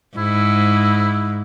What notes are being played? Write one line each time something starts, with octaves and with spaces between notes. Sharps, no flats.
G#2 E4